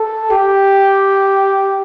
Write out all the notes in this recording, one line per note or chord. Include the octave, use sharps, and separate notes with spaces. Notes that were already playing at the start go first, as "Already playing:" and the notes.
Already playing: A4
G4